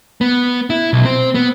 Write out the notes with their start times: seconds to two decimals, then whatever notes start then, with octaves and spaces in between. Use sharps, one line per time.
0.21 B3
0.70 E4
0.93 B1
1.05 C4
1.35 B3